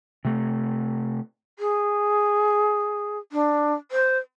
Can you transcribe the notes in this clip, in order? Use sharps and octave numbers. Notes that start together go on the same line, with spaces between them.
C3 A3
G#4
D4
C5